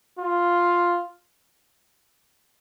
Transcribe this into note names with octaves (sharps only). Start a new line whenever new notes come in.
F4